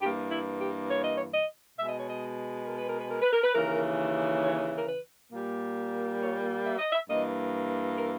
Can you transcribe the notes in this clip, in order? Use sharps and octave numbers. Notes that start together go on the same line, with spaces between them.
G2 E3 A#3 G4
E4
G4
C#5
D#5
C#5
D#5
B2 G#3 E5
D#5
C#5
D#5
A#4
B4
A#4
B4
A#4
B4
A#4
B4
D#2 C#3 E3 A#4
C#5
A#4
B4
A#2 G3 A#3
C#5
E5
D#5
E5
G2 E3 A#3 D#5
A#4